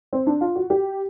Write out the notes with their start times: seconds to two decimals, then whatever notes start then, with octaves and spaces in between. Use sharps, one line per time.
0.13 C4
0.27 D4
0.41 F4
0.55 F#4
0.70 G4